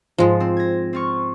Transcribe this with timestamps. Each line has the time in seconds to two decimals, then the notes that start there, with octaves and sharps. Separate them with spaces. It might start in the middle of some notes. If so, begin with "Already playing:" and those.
0.18 G#2 F3 G#3
0.40 C4
0.57 G#6 A#6
0.93 C4 F4 C#6